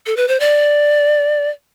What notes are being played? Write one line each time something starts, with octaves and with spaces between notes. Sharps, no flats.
A4
B4
C5
D5